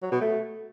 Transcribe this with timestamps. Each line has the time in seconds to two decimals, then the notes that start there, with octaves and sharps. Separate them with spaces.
0.02 F#3
0.12 B2
0.21 A3